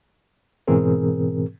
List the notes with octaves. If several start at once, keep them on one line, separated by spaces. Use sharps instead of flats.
G#2 B2 E3 C4 G#4 A#4